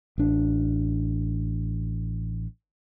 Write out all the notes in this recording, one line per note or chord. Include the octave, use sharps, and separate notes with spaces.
A1 D4